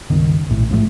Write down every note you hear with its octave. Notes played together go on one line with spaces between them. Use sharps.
G1 C#2 D#3
A#1 A2
A1 G#2 F3 A3